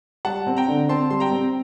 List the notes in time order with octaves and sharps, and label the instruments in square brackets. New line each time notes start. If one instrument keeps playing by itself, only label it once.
[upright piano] G3 [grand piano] F#5 A5
[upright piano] C4
[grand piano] G5 A#5
[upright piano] D3
[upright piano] C4 [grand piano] A5 C6
[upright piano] G3 [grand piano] C6
[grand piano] G5 A#5
[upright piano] C4